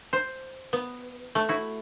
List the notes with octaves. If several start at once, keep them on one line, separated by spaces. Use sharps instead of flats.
C5
B3
A3
E4 F#4